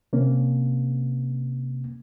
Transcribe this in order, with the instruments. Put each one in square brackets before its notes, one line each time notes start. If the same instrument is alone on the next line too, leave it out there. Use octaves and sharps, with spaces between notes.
[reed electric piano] C3 A#3 C#4